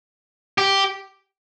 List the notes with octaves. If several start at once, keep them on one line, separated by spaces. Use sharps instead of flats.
G4